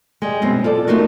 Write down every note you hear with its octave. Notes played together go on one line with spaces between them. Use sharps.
G3 G#3
F#2 B2 B3 C4
F4 A4 D5
A3 B3 D#4 F4 F#4 A#4